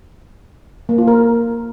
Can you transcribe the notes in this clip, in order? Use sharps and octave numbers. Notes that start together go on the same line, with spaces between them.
A#3
F4
A#4